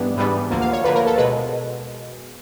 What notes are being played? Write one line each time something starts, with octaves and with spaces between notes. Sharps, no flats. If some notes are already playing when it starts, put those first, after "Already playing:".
Already playing: G#2 E3 G3 B3 D4
G#2 E3 G3 B3 D4
D2 D3 F3 A#3
F5
C#5
D2 D3 F3 A#3 B4
A#4
A4
B2 G#3 B4